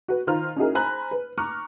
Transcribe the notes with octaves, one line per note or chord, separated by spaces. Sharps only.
F#4 B4
D#3 F4 C5 A#5 F6
C#4 D#4 E4 F#4 G#4 A#4
C5 G#5 A#5 B5 F#6
B4
A#5 C#6 D6 F6 F#6